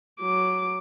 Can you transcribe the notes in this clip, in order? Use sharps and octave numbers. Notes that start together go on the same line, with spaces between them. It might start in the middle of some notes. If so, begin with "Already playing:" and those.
F#3 D6